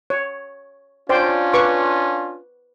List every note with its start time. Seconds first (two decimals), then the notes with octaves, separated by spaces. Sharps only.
0.10 C#5
1.09 C#4 D4 F4 C5 D5 G5
1.53 B4 C#6 D6